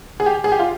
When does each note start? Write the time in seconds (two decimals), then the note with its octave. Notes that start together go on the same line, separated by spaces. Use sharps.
0.20 G#4
0.26 G4
0.44 G#4
0.52 G4
0.59 F4